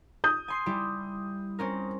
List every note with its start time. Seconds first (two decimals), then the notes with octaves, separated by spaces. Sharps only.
0.24 D#6 G6
0.48 G#5 C6 C7
0.66 G3 E4 G4
1.59 C4 C#4 A#4